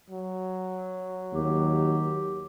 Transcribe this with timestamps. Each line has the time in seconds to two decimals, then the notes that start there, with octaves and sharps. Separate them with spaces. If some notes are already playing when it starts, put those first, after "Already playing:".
0.10 F#3
1.33 D#2 G4